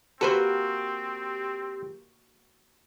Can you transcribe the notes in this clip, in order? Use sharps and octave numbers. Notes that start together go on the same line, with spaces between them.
A#3 C4 F#4 G4 A4 B4 C5